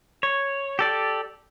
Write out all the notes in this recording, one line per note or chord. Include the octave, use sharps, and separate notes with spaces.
C#5
G4 A4 D5